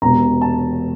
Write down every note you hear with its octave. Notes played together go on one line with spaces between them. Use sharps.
E1 E2 C3 A#5
A5